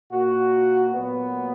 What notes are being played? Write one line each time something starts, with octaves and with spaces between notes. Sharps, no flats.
A#2 A#3 F#4
A#2 F#3 A#3 B3